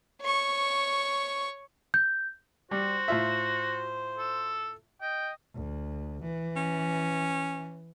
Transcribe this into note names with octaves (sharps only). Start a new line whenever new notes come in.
C#5 C#6
G6
G3 F#4 C5
A2 F4 E5
A4
D#5 G5
D2
E3
C#4